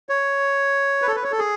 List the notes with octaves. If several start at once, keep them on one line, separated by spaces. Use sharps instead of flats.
C#5
B4
A4
B4
C#5
A4
G#4